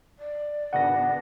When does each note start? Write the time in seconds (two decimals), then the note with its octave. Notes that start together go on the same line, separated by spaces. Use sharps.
0.19 D5
0.73 G#1 C#3 B3 D4 D#5 F#5 A#6